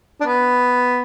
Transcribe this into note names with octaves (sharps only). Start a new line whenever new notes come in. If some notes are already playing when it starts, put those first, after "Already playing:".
D4
B3